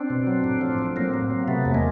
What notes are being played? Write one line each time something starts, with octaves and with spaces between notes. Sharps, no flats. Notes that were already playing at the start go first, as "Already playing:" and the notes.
Already playing: C4 D4
B2
F#3
A2
F3
A2
F#3 A#3 C4
F#3
F#3
C3 A3 B3
E2
G#3 A#3